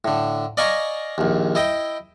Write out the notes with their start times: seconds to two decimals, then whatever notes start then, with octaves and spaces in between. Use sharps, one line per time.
0.05 A2 D3
0.57 D5 D#5 F5 G#5 A#5 C#6
1.18 A#1 D#2
1.55 E4 D#5 G5